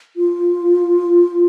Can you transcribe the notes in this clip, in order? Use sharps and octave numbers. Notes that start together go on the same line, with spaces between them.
F4